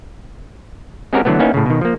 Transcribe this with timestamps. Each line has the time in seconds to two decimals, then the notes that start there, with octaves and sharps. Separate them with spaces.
1.13 G#3 C4 C#4 F#4 G4 A#4
1.25 D3 E3 F#3 A3 B3
1.39 A#3 B3 C#4 D#4 E4
1.54 A2 C#3
1.66 B2 D#3
1.81 F3 A#3